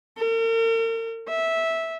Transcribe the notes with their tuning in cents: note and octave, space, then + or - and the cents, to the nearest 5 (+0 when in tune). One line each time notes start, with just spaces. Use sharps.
A#4 -40
E5 -10